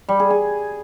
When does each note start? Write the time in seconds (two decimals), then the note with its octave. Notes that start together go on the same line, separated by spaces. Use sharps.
0.09 G3
0.19 G#4
0.30 G#4